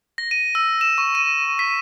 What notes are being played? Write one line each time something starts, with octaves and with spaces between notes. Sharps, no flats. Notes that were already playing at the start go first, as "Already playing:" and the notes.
A#6
D#7
E6
E7
C#6
D#7
B6